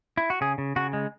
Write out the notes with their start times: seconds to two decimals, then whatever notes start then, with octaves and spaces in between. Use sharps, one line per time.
0.17 E4
0.30 F#4
0.41 C#3 G#4
0.58 C#3
0.76 C#3 F#4
0.93 G#3